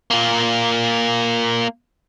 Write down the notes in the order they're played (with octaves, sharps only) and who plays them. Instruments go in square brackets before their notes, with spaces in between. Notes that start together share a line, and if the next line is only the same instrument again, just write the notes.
[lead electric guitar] A#3 F4